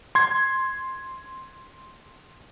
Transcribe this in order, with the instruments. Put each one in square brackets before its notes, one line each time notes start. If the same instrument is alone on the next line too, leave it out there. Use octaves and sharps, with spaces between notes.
[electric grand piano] C6 G#6